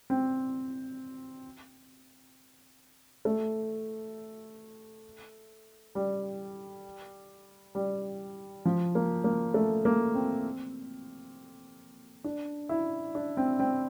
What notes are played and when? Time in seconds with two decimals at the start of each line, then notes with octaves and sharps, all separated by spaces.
0.10 C4
3.25 A3
5.95 G3
7.75 G3
8.65 F3
8.95 A#3
9.24 A#3
9.54 A3
9.85 A#3
10.15 C4
12.24 D4
12.69 E4
13.15 D4
13.37 C4
13.60 C4